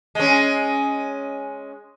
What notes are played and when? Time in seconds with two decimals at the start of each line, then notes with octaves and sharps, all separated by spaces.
0.15 G#3 C#4